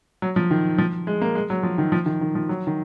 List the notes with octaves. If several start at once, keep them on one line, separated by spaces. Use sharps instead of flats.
F#3
F3
D#3
F3
G#3
A#3
G#3
F#3
F3
D#3
F3
D#3
D#3
F3
F#3
D#3